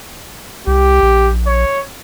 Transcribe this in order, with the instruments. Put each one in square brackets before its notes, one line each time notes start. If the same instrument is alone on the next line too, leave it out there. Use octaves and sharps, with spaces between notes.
[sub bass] C2 [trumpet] G4
[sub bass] A#1
[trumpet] C#5